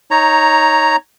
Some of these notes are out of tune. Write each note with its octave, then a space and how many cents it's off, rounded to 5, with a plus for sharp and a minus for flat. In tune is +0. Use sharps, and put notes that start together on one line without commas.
D#4 +15 C#5 +0 A#5 +0